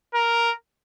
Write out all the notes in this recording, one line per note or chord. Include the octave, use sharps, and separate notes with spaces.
A#4